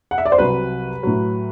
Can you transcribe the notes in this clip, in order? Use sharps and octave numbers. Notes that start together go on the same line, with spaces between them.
F#5
E5
D5
C5
C2 C3 F#3 B4
A2 F#3